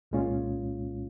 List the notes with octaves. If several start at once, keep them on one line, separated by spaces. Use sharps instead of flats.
C2 A#2 G#3 C#4 F4